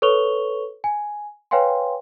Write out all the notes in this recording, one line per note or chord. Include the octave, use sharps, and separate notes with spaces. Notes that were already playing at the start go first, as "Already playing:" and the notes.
A4 B4 C#5 C#6 F7 G7
G#5
B4 C#5 F5 G5 G#5 C6